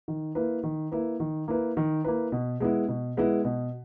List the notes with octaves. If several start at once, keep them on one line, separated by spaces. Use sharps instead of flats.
D#3
A#3 E4 B4
D#3
A#3 E4 B4
D#3
A#3 E4 B4
D#3
A#3 E4 B4
B2
G#3 B3 E4
B2
G#3 B3 E4
B2